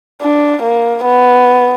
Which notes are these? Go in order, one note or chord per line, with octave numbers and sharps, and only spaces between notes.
D4
A#3
B3